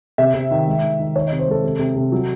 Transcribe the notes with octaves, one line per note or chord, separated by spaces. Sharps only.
C3 E5
C3
D#3
G#3
D#3
D#3
D#3 C#5
D#5
C3
C5
G#3 A4
C3
C3
C3
F#3